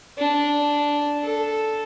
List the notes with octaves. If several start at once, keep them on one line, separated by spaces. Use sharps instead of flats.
D4
A4